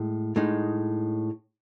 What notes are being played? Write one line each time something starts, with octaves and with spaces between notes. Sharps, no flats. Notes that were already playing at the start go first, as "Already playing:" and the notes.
Already playing: A2 G#3
A2 G#3 D#4